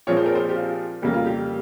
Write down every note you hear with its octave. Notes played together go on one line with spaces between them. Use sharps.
A#2 F3 G#3 C4 C#5
C5
A#4
C5
G4
F4
F2 C#3 G3 A#3 G4
F4
G4